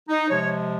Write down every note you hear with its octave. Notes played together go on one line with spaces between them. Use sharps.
D#4
C3 F3 G#3 C#5